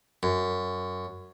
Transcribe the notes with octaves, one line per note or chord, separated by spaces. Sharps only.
F#2